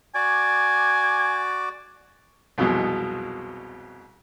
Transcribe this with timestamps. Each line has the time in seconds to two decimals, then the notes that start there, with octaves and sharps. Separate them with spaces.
0.15 F#4 D5 G#5 D6
2.58 C2 F2 B2 F#3 G#3